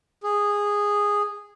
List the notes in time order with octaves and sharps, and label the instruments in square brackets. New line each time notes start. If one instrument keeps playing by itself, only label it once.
[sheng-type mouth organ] G#4